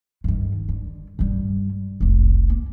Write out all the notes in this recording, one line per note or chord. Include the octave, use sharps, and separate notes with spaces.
G2 D#3
D3
G2 G3
F1 C2
A#3